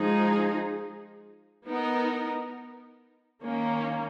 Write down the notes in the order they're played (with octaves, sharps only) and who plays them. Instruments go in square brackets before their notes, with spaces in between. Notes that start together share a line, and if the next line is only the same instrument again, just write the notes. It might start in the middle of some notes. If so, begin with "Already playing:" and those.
Already playing: [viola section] F3 G#3 D#4 G#4
B3 D#4 A#4
D#3 A#3 C#4